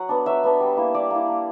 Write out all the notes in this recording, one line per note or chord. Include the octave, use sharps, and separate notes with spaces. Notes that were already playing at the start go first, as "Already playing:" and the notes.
Already playing: F#3 F#5
B3 D4
F#3 E5
B3 D4
G3
A#3 E4
G3 D5
A#3 E4
A#3